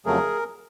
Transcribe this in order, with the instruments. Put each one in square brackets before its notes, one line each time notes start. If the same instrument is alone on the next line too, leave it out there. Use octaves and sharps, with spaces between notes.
[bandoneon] F2 C#3 F#3 A3 G#4 A#4